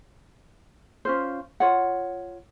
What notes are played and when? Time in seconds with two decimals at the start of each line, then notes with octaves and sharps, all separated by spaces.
1.05 C#4 F4 C5
1.60 F4 C#5 F#5